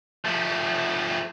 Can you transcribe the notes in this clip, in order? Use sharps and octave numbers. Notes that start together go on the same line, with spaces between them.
F3 A3